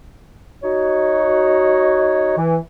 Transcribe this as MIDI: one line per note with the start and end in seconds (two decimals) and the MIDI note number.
0.63 2.35 63
0.63 2.35 66
0.63 2.35 73
2.38 2.56 52